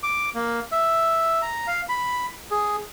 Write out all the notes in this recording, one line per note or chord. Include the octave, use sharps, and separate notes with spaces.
D6
A#3
E5
A#5
F5
B5
G#4